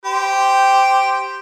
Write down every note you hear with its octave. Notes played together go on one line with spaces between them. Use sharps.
G4 C5